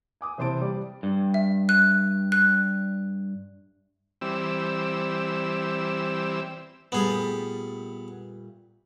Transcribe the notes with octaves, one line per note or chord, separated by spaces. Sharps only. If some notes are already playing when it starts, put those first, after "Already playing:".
G#5 D6 D#6
C3 E3 C5 A5 C6 D7
G3 D5
G2
E5
F#6
F#6
E3 G3 C4 E6
A#2 G3 A3 B3 G#4